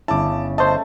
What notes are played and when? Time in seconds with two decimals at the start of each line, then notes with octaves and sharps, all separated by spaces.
0.08 G1 C#3 E4 A5 D6
0.58 A3 C5 D#5 A5